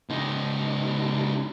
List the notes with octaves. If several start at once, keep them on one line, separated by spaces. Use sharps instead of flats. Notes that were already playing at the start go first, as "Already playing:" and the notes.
C#2 D#4